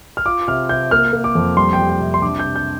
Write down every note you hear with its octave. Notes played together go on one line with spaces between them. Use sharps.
F6
F4 D6
C3 F6
C3 G6
A#3 F6
A#3
D6
F2
G3 C6
G5
G3
G5
C3
C6
D4 D6
G6
C3
G6